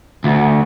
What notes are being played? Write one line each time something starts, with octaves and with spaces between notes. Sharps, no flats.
D2